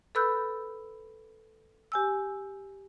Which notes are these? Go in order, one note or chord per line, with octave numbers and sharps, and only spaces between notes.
A4 B4 B5 E6 F#6 G6
G4 G#5 E6